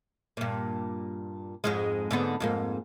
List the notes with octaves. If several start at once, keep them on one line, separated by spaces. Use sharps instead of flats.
G2 A#2
F2 G#2 G#3
G#2 D3 B3
F2 G#2 A#3